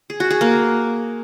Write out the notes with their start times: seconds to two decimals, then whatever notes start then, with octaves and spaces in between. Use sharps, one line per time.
0.10 G#4
0.20 F#4
0.30 G#4
0.41 A#3